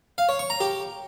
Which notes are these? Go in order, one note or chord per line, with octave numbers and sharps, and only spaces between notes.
F5
C#5
C#6
A#5
G4